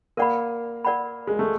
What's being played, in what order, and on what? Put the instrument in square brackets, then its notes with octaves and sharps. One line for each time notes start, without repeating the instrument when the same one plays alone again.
[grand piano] A#3 [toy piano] A#4 D5 F#5 B5
[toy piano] A#4 D5 F#5 B5
[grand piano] G#3
A3